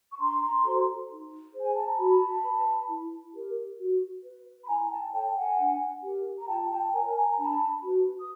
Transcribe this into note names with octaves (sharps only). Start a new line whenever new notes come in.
C#6
D4 A#5 C6
F#4 A4 C5
D#4
G#4 C5
G#5
A5
A#5
F#4 A5 B5
B4
E4
G4 A#4
F#4
B4
B5
E4 G#5 A#5
G5 A5
A4 C#5 G5 A5
F#5 G#5
D4
G4 A#4
A#5
F4 G5 A5
G5 A5
A#4 C#5 G#5 A#5
A5
G#5 A#5
A#5
D4 A5 B5
F#4 B4
D#6